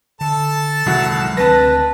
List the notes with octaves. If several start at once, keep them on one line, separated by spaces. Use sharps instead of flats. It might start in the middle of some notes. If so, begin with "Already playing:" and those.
D3 A4 A5
C2 D#3 F#3 G#3 F#4
D2 C4 B4 A5 A#6